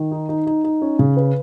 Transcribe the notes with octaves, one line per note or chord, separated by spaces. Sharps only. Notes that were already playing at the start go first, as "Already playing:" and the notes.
Already playing: D#3
D#4
D#4
D#4
D#4
C#4
C#3
B4